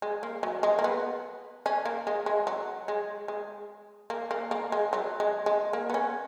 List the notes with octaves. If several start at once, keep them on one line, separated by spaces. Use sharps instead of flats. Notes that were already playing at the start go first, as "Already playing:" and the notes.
G#3
A#3
F#3
G#3
A#3
B3
C#4
A#3
G#3
G#3
F#3
G#3
G#3
A#3
A#3
A#3
G#3
F#3
G#3
G#3
A#3
B3
C#4